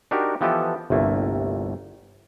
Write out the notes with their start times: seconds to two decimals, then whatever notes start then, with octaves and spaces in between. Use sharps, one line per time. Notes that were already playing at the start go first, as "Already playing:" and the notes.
0.11 D4 D#4 F#4 G4 A#4
0.41 E3 F3 B3 G4 A4 D#5
0.90 G1 C2 A3 A#3